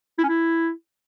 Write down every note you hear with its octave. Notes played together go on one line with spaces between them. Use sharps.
E4
C#4
E4